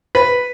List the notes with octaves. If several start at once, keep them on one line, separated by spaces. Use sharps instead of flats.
B4